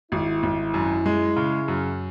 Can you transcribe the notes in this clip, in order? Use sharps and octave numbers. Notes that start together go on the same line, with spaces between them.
G#1 E4
G#1
F#2
G#3
C#3
F#2